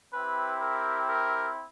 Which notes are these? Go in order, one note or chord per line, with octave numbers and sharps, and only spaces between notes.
C4 E4 G4 B4
A#4
A#4